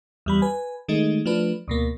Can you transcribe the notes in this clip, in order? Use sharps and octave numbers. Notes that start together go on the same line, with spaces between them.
E2 G3 B5
B4 G#5
D#3 G#3 A3 D#4
F3 A3 D4 B4
D2 B2 A#3